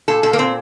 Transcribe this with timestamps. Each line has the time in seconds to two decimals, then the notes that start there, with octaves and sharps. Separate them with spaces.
0.08 A#2 A4
0.23 A#2 A4
0.33 A#3
0.38 A#2 C4